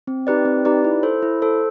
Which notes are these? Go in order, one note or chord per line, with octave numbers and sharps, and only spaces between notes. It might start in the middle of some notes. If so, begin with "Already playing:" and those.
C4
D#4 G4 B4 D5
C4
D#4 G4 B4 D5
E4
A4 C5
E4
A4 C5